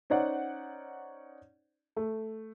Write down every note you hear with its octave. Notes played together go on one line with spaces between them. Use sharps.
C#4 D#4 C5 D5 F#5
A3